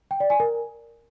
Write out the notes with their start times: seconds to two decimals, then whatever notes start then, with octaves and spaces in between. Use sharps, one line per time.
0.11 G5
0.20 D5
0.30 G#5
0.40 A#4